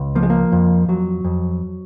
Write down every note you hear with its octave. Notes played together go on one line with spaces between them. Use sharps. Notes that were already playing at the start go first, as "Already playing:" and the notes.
Already playing: C#2
F3 A#3
G#3
A#3
F2
F2 F#3
F2